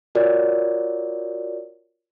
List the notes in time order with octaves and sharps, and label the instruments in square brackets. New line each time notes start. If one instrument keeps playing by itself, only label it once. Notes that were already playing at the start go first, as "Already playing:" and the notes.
[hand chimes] F4 F#4 A#4 C#5 D5